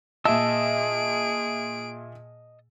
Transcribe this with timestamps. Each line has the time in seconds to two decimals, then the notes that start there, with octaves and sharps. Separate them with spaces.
0.25 A#2 G#4 D#5 E5 A5 E6 D7